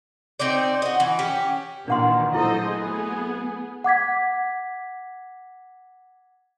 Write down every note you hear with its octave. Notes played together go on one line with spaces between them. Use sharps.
C4 D#4 C5 D5
F#4 D#5
E3
C#4 G4
A#2 D#3 E3 D4 F#5 C6
F#3 A3 E4 A4 C5 D#5
B3 G#4
F#5 D6 G#6 B6